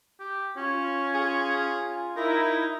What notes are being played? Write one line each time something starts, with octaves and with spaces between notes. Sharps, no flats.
G4
C#4 F4
G#4
D#4 E4 A#4